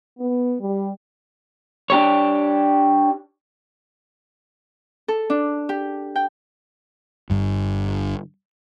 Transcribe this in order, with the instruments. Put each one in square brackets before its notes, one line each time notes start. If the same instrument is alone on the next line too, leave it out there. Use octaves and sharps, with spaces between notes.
[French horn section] B3
G3
[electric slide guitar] D4 G4 C#5
[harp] A4
D4
G4
G5
[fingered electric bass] G1 G2